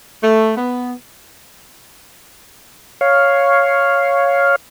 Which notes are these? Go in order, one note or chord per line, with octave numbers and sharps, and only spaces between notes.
A3
B3
C#5 F5